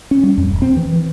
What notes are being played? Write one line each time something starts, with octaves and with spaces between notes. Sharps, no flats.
C#4
G3
F2
D#1
C4
E3
E3